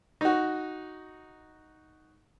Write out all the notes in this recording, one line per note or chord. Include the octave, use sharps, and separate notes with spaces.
D#4 F#4